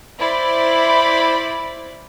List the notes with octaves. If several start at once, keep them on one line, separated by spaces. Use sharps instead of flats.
E4 C5 D5 B5